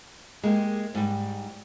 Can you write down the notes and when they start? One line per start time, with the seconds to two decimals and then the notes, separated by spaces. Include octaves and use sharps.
0.44 G#3 A#3 G4
0.95 G#2 G3